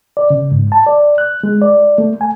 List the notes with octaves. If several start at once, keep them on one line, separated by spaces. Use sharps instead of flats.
D5
C#3
G#2
A5
D5
F#6
G#3
D5
A3
G#5